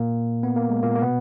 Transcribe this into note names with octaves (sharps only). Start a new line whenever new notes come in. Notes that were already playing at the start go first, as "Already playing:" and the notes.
Already playing: A#2 A#3
B3
A#3
G#3
A#2 A#3
A#3
B2 B3